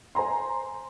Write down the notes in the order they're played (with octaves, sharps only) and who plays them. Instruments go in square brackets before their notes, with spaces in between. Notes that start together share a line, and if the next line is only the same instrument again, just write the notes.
[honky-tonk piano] C5 G#5 A#5 C6